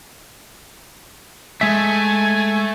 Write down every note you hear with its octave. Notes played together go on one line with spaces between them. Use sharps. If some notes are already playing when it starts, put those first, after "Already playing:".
G#3 A3 E5 G#5